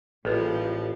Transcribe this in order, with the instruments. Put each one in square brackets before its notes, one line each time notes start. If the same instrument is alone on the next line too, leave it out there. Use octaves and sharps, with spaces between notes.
[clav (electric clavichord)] A1 [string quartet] A#2 F3 G3 [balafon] G#4 B4